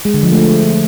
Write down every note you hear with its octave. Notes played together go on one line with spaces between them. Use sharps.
G#3
D3
F3
A3